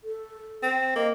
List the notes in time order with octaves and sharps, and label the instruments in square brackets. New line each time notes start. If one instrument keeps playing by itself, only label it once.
[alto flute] A4
[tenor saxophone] C4
[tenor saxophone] A#3 [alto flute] D#5